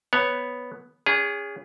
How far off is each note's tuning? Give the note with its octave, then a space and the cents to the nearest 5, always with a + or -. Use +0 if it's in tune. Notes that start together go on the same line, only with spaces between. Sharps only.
B3 +0 C#5 +0
C#4 +35 G#4 -20